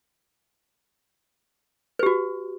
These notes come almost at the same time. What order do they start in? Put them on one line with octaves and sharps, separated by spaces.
B4 G4 F#4